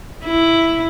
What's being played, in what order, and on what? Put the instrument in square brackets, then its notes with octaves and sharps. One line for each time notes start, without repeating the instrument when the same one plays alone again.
[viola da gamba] E4